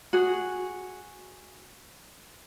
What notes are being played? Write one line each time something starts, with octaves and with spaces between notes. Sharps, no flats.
F#4 G#4